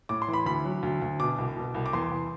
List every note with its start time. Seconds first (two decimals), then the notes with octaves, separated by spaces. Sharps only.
0.09 A2 D6
0.22 C6
0.28 E3
0.33 B5
0.46 D2 B5
0.65 F#3
0.83 D2
1.02 D2
1.20 B2 D6
1.38 C2
1.57 B2
1.74 C2
1.86 D6
1.93 E2 C6
2.12 E2